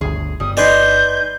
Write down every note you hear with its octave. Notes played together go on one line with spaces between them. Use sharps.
G1 D2 G#4
G1 G3 D#6
D#4 B4 D5 D#5 G#5 C6 G6